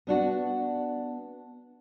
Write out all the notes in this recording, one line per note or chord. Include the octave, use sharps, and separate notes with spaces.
B3 D4 F#4